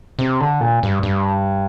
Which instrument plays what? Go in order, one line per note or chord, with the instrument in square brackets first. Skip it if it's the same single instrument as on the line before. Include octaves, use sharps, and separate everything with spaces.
[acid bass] C3
D3
A#2
G2
G2